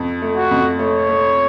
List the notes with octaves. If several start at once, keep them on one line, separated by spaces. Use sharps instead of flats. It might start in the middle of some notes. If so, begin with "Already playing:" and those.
Already playing: F2
A3
F#4
F2
A3 C#5
A3